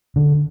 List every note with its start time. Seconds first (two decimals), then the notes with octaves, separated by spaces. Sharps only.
0.16 D3